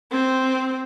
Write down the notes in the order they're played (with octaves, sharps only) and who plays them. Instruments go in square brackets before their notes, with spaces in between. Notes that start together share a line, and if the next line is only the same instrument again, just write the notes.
[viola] C4